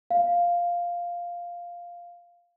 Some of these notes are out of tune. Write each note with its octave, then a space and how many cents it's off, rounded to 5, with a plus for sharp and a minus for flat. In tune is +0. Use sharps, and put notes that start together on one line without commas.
F5 +0